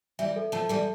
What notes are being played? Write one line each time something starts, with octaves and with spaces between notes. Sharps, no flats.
E3 G3 E5
A4
F3 A3 A5
E3 G3 A4